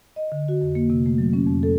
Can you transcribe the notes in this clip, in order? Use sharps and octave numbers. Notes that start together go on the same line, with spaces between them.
D#5
D3
F#4
F2
A#3
C3
A3
F#3
C#4
F2
A4